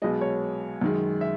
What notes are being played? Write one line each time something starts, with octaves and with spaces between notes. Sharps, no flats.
B1 B2 G#3 D#5
C#5
F#2 D#3 G#3
E5